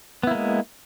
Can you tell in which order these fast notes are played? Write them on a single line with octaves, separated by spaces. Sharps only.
B3 E4 A#3 G#3